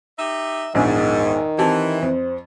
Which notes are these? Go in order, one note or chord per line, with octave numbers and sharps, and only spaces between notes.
D#4 G4 E5
A#1 E2 G#2 D#3
E3 C4 G4 A5
F2 C5